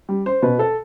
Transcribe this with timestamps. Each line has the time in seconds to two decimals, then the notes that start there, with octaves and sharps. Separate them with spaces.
0.09 G3
0.26 C5
0.42 B2 B4
0.59 A4